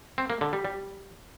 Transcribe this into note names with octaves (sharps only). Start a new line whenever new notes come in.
C4
A#3
D3
G3
G3